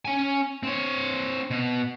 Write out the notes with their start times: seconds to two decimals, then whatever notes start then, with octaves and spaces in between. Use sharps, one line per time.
0.05 C#4 G#5
0.63 C4 C#5
1.51 B2